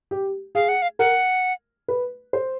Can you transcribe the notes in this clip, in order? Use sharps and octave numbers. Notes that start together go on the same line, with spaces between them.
G4
G#4 F5
F#5
F5
A#4 F#5
B4
C5